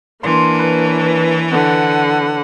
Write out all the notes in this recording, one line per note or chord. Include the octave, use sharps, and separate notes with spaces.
E3 A#3 D4 C6
B4 C#5
D3 F#5